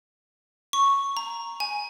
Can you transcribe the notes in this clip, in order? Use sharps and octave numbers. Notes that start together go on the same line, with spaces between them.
C#6
A#5
G#5